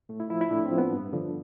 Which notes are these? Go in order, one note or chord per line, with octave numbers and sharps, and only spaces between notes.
A2 A3
E4
F3 E4
E4
A2 D4
C4
F3
B3
G2
D3 F3